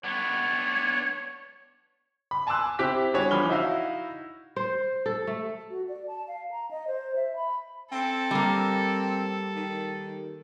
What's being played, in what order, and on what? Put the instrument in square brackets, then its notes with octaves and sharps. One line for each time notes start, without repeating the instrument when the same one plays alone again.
[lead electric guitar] B3 D4 [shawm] C#5
[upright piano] B5
G#5 A5 C6 D6 E6 F#6
C4 E4 G4 D6 F#6 B6
G3 D4 F#4 G#4 C#5
E3 F3 B5 F6 G7
D#4 E4 F#4 E5 F5
[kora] C5
A4
A3
[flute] F#4
D5
A5
F5
A#5
D#5
C5
E5
B5
[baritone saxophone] C4 [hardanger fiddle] A4
[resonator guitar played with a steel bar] G3 A#3
[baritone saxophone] D#3